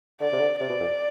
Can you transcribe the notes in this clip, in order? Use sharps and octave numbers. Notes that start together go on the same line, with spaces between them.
D3 D5
C3
D3
C3 D5
B2
F2